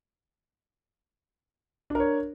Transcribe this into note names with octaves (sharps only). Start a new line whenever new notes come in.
D4 A#4 C#5